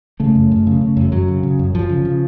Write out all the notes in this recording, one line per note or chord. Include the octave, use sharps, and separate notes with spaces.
C#3 A3
F#2
F#2
C#3
C#3
F#2
F#2 F#3
C#3
C#3
F#2
F#2 F3
C#3
C#3